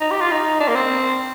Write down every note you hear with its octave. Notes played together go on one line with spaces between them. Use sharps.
D#4
G4
F4
D#4
D4
A#3
C4